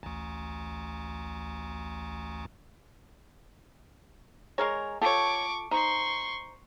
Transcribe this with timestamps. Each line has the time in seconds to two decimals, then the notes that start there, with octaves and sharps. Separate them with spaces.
0.03 A1 D2
4.58 G#3 G#4 A#4 C#5 A#5 C#6
5.01 F4 G4 A4 C#5 A5 C#6 D6
5.71 D#4 C5 C6 C#6